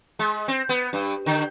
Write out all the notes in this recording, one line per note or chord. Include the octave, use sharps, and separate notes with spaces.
G#3
C4
B3
G2
D3